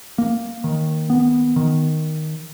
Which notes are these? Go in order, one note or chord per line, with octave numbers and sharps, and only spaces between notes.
A#3
D#3
B3
D#3